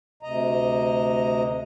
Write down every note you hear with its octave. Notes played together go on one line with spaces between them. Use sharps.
D2 C3 D#5 A#5